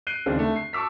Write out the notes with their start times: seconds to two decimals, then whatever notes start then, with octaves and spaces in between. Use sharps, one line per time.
0.07 F#6 C7 D7 D#7 G7
0.26 D#2 C#3 G#3 C4 D4
0.38 D3 A3
0.56 C7
0.73 A5 C#6 D6 E6 B6